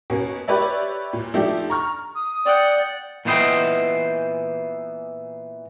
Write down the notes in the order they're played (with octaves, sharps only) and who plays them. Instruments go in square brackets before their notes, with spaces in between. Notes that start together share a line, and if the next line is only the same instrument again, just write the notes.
[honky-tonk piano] B2 A#3 C#4
G4 B4 C#5 D5 E5
A#2
F3 A3 D4 D#4 G4
A#5 C#6 F6
[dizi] D#6
[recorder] D5 [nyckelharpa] F#5 G5
[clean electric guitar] A#2 E3 B3 C5 D#5 G5